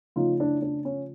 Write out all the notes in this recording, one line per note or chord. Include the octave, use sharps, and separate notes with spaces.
C#3 F3 A3 C#4 D#4 F4
D4 E4
D4
C#4